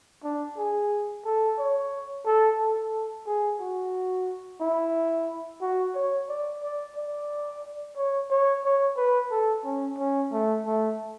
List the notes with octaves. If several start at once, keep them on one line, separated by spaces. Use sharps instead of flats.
D4
G#4
A4
C#5
A4
A4
G#4
F#4
E4
F#4
C#5
D5
D5
D5
C#5
C#5
C#5
B4
A4
C#4
C#4
A3
A3